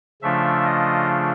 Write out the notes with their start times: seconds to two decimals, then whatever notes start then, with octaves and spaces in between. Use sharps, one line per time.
0.22 C#3 F3 A3 D4 F4 E5
0.64 D#5